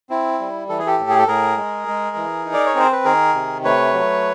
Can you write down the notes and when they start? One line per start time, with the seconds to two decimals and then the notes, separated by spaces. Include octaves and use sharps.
0.10 C4 E4
0.40 G3
0.69 E3 A4
0.79 G#4
0.87 G4 A4
0.99 A2
1.10 G#4
1.19 A4
1.28 A2 G#4 A#4
1.57 G#3
1.88 G#3
2.16 E3
2.45 D#4
2.53 D5
2.66 C#5
2.75 C4 C5
2.92 B4
3.05 D#3 G#4 A#4
3.34 C3
3.64 A3 B4 C#5
3.93 F#3